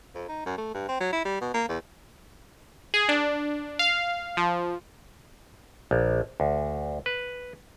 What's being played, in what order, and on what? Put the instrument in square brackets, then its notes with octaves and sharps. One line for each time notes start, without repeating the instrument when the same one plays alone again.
[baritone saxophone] F2
D#4
F#2
A3
G2
C4
F#3
E4
G3
B2
A#3
E2
[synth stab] G#4
D4
F5
F3
[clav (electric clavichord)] A#1
D2
B4